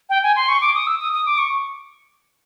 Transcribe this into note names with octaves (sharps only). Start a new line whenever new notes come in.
G5
G#5
C6
C#6
D6
D#6
E6
D#6
D#6
D6
C#6